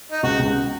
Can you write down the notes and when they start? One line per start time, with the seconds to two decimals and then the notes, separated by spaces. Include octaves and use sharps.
0.11 D#4
0.23 C#2 F#4
0.39 C#2